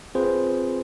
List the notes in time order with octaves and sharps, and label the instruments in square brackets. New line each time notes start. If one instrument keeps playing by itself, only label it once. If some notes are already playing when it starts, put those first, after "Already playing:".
[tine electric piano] C4 F4 G#4 B4 C5